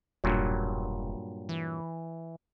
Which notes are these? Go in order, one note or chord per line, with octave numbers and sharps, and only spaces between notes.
E1 G2 A#2 F#3
E3